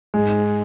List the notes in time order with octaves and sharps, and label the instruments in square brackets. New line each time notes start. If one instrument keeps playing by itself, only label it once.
[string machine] G#2 [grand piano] G#3